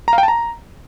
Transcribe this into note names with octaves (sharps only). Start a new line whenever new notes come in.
A#5
F5
G5
A5
A#5